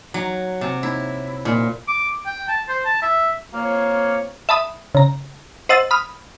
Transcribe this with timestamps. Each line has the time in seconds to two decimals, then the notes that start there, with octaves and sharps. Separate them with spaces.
0.14 F#3
0.61 C3
0.83 E4
1.45 A#2
1.88 D6
2.26 G5
2.49 A5
2.69 C5
2.85 A5
3.02 E5
3.54 A#3 C4 F4 C#5
4.49 E5 A5 B5 D#6
4.95 C#3 A#5
5.69 C5 D#5 F#5 E6 A6
5.91 B5 D#6 F6